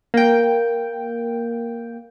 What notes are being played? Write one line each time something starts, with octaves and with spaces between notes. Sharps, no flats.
A#3 G5